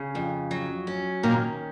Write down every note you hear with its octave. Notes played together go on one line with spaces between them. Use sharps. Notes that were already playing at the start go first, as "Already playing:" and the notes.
Already playing: C#3
F2
F#3
C#4
A#2 D#3 A#3